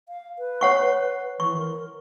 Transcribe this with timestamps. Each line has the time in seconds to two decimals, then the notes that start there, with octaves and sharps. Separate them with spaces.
0.09 F5
0.39 B4
0.61 C#5 F#5 C#6
1.40 E3 C#6
1.58 A#4